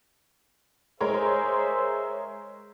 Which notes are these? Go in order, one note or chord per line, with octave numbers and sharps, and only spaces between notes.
G#3 G#4 A#4 C5 C#5 E5